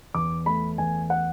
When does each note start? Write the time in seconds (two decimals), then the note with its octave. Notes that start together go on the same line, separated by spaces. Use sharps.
0.14 E2 D6
0.46 A3 B5
0.78 E2 G#5
1.10 F#5